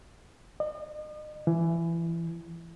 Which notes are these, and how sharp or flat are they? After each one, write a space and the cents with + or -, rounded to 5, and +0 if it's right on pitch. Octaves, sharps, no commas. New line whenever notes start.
D#5 -40
E3 +20